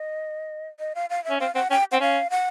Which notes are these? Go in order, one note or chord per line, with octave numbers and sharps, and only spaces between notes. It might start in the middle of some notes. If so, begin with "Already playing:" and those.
Already playing: D#5
D#5
F5
F5
E5
C#4
C4 F5
C4 F#5
C#4 G5
C4 F#5
C#4 F5
F#5